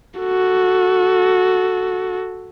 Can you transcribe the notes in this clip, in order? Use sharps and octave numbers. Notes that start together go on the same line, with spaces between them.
F#4 A4